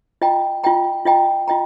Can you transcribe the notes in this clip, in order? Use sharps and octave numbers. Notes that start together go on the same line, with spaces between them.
F4 D#5 G5 A#5
F4 D#5 G5 A#5
F4 D#5 G5 A#5
F4 D#5 G5 A#5